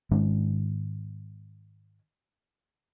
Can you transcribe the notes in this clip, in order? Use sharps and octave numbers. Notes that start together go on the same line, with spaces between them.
G#2 D#3 G#3 C#4